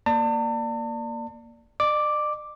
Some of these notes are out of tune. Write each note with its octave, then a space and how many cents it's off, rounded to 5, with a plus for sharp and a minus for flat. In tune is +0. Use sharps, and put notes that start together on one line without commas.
A#3 +0 D5 +5 A5 +40
D5 +45 D6 +0